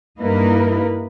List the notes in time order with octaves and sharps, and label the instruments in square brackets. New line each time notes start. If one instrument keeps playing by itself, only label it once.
[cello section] G2 A#3 D#4 E4 A#4 B4